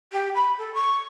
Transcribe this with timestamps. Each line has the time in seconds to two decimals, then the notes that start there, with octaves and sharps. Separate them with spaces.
0.13 G4
0.35 B5
0.58 A4
0.74 C#6